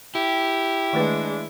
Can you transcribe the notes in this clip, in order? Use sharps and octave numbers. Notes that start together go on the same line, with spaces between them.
E4 G4
D#3 G#3 A3 D4 B4